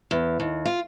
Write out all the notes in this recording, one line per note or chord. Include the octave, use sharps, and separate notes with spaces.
E2
D#2
F4